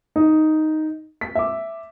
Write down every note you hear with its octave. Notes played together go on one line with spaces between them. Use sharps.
D#4
B6
E5 D6